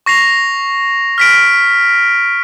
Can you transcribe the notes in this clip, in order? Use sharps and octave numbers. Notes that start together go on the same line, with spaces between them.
C#6 A#6 C7 F7
F6 B6 D7